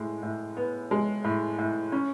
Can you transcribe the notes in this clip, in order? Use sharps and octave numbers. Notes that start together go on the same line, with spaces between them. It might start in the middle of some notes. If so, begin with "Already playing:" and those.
Already playing: A2 G#3
A2
B3
G#3
A2
A2
C#4